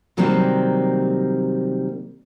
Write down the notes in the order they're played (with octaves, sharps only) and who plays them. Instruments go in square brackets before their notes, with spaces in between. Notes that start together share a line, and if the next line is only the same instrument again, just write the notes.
[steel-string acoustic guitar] C3 D#3 F#3 G3 A#3 C4